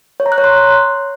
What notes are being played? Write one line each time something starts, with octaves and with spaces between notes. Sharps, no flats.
C#5
A#5
F#6
C#5
C6